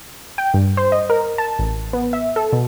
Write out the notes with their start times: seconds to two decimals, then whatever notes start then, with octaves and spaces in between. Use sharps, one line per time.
0.38 G5
0.54 G2
0.77 C5
0.92 D#5
1.10 A#4
1.38 A5
1.59 A1
1.93 B3
2.13 E5
2.36 A4
2.53 B2